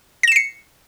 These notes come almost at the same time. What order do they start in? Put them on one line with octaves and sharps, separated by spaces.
A#6 E7 C7 C#7